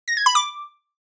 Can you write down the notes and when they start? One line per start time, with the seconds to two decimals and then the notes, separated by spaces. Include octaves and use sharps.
0.08 A#6
0.17 G#6
0.26 B5
0.35 D6